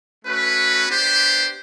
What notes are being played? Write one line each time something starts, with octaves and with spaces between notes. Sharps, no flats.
A3 C#4 F#4 B4
B3 D4 G4 C5